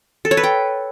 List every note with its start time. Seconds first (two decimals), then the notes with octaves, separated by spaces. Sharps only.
0.25 A4
0.31 C#5
0.37 B4
0.44 G5